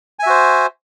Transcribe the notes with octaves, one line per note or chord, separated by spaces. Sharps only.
F#4 C5 E5 G#5